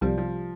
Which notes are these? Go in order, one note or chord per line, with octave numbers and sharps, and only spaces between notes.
C2 C3 F3 G3
F3